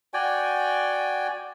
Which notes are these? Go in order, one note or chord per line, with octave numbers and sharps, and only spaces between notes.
F#4 D5 G5 G#5